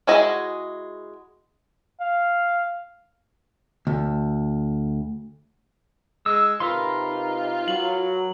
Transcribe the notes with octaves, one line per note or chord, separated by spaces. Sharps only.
G#3 E4 F#4 G#4 D#5
F5
D2
G#3 E6
C3 C4 D#4 F4 A#4 B4 C6
F#3 F#7